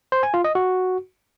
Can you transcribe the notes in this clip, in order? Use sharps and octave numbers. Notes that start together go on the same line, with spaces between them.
C5
G#5
F4
D#5
F#4